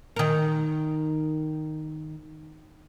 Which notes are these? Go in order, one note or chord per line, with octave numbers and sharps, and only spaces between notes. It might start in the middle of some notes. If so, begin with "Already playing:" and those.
D#3 A#4